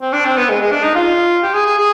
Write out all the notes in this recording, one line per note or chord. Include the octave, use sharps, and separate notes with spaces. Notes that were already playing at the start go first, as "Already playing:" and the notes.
C4
D4
C4
B3
G#3
G#3
D4
D#4
F4
G4
G#4
G#4
G#4